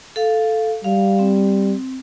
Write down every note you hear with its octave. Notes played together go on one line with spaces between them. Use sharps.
A4 F5
G3 F5
C4